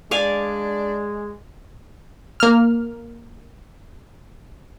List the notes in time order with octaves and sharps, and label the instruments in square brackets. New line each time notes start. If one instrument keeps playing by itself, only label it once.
[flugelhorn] G#3 [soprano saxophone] D4 [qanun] D5 F5 G#5
[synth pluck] A#3 F6